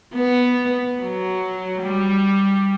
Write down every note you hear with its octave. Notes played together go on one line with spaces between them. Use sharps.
B3
F#3
G3